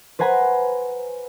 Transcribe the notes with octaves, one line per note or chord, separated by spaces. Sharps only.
B4 C5 F#5 G#5 A#5 B5